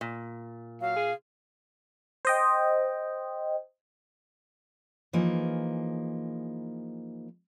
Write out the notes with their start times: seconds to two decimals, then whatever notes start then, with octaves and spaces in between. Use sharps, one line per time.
0.01 A#2
0.81 F#3 F5
0.96 G#4
2.25 C5 D#5 G5
5.13 E3 F3 A#3 D#4 G#4